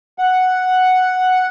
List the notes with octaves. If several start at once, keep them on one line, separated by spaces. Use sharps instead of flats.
F#5